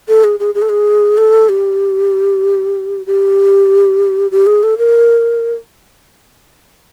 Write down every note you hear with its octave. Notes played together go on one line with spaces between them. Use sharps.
A4
G#4
G#4
G#4
A4
G#4
A4
G4
G4
G4
G#4
A4
A#4